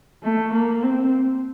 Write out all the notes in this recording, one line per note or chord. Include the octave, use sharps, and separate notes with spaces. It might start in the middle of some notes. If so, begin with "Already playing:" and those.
A3
A#3
C4